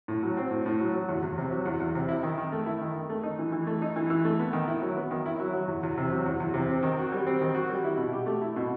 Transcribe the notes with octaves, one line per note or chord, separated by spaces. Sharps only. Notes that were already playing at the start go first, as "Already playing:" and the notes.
A2
F#3
C4
A2
A2
F#3
F#3
E2
E2
C3
F#3
E2
E2
C3
E4
D#3
D#3
A3
E4
D#3
D#3
A3
D#4
E3
E3
A3
D#4
E3
E3
A3
B3
D#3
E4
F#3
B3
D#3
E4
F#3
F#3
E2
E2
C3
F#3
E2
E2
C3
C4
D#3
F#4
G3
C4
D#3
F#4
G3
E4
B2
G4
A3
E4
B2